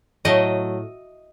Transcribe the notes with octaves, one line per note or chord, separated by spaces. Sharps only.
A2 F#3 A3 D#5